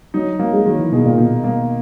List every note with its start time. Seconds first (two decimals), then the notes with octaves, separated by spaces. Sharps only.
0.14 F#3 D#4
0.39 F#3 A#3
0.53 G#3
0.66 D#3 F#3
0.79 E3
0.92 B2 G#4
1.05 A#2
1.18 B2 D#4
1.44 A#3